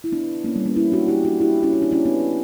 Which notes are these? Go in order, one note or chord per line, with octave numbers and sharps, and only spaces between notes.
E4
B3 D4
A#3 C#4
G3 B3
A#3 C#4
C#4 E4
D4 F#4
E4 G4
D4 F#4
E4 G4
C#4 E4
E4
D4
C#4 E4
B3 D4